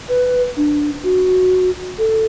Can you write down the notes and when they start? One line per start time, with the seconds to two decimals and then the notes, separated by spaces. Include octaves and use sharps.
0.09 B4
0.57 D4
1.04 F#4
1.98 A4